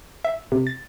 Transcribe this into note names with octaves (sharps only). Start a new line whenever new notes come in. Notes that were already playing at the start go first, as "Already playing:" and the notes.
E5
C3
A6